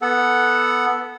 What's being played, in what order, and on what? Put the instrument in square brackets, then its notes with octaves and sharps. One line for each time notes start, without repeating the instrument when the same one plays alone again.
[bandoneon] B3 A4 F#5